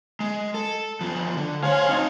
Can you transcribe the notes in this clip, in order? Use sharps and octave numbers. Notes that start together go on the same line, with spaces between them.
G#3
A4
E2 F3
D3
A2 C5 C#5 F5 G#5
C4 D#4